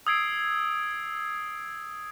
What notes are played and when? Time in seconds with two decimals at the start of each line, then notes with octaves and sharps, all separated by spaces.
0.07 D#6 E6 G#6 C7 D7